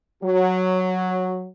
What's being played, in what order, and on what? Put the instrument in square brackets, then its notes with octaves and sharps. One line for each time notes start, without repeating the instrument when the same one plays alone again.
[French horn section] F#3